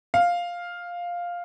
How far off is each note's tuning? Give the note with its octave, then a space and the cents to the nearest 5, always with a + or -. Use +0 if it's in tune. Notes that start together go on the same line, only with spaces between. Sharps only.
F5 +5